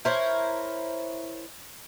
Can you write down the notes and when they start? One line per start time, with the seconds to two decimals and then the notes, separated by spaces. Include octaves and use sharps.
0.05 E4 A#4 C5 C#5